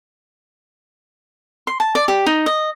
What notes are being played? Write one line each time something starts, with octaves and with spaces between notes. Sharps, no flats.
C6
A5
D5
G4
D#4
D#5